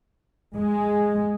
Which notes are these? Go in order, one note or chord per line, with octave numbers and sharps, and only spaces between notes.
G#3